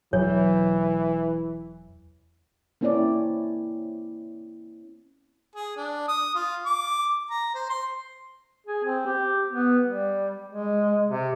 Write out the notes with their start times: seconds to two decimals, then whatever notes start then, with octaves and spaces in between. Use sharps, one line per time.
0.13 E1 B2 E3 F#3 C#5
2.81 A#3 C4 C#4 E4 C#5 D5
5.55 G#4
5.77 D4
6.08 D#6
6.35 F4
6.65 D6
7.30 A#5
7.55 C5
7.70 C6
8.67 G#4
8.84 C4
9.06 G4
9.50 B3
9.85 G3
10.49 G#3
11.08 C3